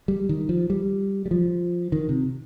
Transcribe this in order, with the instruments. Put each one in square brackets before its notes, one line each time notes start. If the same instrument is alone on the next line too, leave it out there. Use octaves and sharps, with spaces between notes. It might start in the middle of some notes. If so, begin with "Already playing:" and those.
[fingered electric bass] G3
D#3
F3
G3
G3
F3
D#3
C3